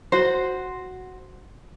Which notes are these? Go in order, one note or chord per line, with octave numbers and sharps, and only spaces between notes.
F#4 C5